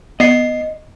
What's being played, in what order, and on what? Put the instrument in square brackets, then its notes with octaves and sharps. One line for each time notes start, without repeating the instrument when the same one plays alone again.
[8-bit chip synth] B3 C7 [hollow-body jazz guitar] D#5